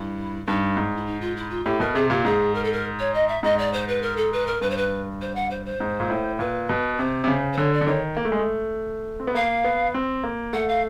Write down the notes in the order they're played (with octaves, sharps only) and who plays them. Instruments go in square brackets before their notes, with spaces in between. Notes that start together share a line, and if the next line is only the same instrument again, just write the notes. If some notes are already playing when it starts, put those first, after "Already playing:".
Already playing: [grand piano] G2 [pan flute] E4
[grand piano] G2 [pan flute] D#4
[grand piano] G#2
[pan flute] E4
D#4
F4
E4
F4
[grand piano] A2 [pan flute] G4
[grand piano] B2 [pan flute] A#4
[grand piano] C3 [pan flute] G#4
[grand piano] A#2 [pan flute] G4
[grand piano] G#2 [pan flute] G#4
[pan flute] A#4
A4
A#4
C#5
D#5
E5
[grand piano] G#2 [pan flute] D#5
[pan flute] D5
C5
B4
A#4
A4
B4
A#4
[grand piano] G2 [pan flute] B4
[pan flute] C5
B4
C5
F#5
C5
C5
[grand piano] G#2
A#2
A2
[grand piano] A#2 [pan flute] B4
[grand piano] B2
[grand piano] C3 [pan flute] C5
[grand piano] C3
C#3
[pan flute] C5
[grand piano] D3 [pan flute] C#5
[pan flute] D5
[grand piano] D3
[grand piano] D#3 [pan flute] C#5
[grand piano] A#3
A3
G#3
A3
C4
B3
[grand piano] A#3 [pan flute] F5
[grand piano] B3
C4
A#3
[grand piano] A3 [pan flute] F#5
[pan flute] F5